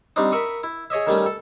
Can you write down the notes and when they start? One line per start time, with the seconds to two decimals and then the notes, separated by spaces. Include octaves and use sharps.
0.16 G3 C4 D4 D#4
0.32 A#4 E5 B5 C#6 D#6
0.63 E4
0.90 G#4 C#5 D#5 E5
1.07 D#3 G3 A3 C#4
1.26 A4